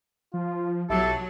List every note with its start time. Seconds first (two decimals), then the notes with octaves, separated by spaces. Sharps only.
0.34 F3 F4
0.90 B1 F#3 E4 G4 A4 A5